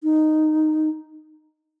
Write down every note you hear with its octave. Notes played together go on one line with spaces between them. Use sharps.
D#4